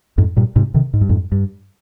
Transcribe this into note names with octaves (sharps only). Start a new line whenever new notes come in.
F2 G#2
G2 A#2
G#2 C3
C3 D#3
G#2
G2
F2 G#2
G2